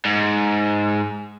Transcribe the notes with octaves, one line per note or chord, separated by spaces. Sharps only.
G#2